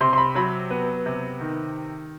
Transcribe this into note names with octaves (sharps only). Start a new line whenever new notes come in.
C3 C6
C6
B5
F#3 B5
B3
C3
D#3